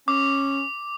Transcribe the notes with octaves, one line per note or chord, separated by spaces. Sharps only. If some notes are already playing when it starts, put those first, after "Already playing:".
C#4 D6